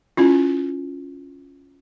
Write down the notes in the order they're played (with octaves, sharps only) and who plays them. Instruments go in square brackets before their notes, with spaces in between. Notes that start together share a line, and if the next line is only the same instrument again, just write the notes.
[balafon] C#4 E4 F4